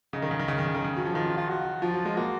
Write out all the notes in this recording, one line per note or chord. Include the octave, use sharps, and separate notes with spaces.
C#3 D#4
D#3
C#3
D#3
C#3 C#4
D#3
C#3
D#3
C#3
F#3
F3
D#3 F4
F4
F#4
F3 F4
F#3
G#3
A#3 F#4